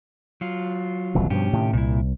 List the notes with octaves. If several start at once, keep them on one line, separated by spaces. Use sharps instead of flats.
F#3 F4
D#1 C2 E3
G2 B2 F3 C#4 G4
A2 C3 D#3
C2 A#2 E4